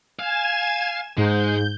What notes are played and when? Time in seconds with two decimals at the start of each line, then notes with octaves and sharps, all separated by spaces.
0.19 F5 G#5 G#6 E7
1.17 G#2 G#3 G6